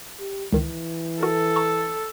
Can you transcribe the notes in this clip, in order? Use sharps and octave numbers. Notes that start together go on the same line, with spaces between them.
G4
C#2 D#3 E3
F#4 A4 A#4
A#5 C#6